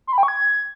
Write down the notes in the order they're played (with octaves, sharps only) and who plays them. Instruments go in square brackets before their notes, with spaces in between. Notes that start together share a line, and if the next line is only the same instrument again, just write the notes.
[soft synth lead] C6
B5
G5
C#6
G#6